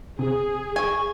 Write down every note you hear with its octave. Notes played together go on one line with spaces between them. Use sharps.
C3 G#4
G#5 C#6